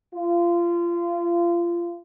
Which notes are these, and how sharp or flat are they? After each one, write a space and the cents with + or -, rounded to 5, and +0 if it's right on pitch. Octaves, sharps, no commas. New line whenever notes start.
F4 -25